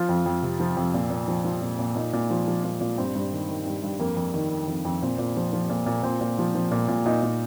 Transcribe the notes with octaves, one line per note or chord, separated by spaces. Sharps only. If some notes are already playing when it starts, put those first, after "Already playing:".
Already playing: F3 F4
F2
F2
C3
F3
F2
A#2
A#2
F3
F3
A#2
A#2
A#2 D#4
A#2
F3
F3
A#2
A#2
G2 C4
G2
D#3
D#3
G2
G2
F2 A#3
F2
D#3
D#3
F2
F2
A#2 C4
A#2
F3
F3
A#2
A#2
A#2 C4
A#2
F3
F3
A#2
A#2
A#2 D#4
A#2